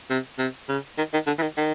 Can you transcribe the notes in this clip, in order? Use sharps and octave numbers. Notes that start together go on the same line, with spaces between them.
C3
C3
C#3
D#3
D#3
D3
E3
D#3
D#3